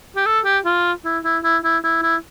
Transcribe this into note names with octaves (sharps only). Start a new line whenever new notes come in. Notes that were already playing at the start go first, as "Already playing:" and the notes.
G4
A4
G4
F4
E4
E4
E4
E4
E4
E4